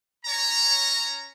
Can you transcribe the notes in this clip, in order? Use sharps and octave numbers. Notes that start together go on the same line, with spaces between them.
C#4 C#5 A#5